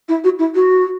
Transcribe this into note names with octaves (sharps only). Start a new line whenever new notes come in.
E4
F#4
E4
F#4